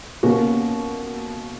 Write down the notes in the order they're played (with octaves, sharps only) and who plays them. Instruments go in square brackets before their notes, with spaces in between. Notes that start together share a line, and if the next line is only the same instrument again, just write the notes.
[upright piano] B2 A#3 C#4 F#4